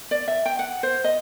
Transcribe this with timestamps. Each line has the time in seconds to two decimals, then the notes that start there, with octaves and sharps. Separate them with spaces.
0.11 D5
0.28 E5
0.46 G5
0.59 F#5
0.83 C5
1.04 D#5